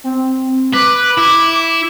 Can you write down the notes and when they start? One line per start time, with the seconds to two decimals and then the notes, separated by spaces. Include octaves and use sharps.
0.04 C4
0.73 B4 D6
1.17 E4